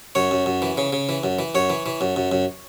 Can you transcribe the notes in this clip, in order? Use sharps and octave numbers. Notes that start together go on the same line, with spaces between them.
F#2 C#5
F#2
F#2
E3
C#3
C#3
E3
F#2
E3
F#2 C#5
E3
E3
F#2
F#2
F#2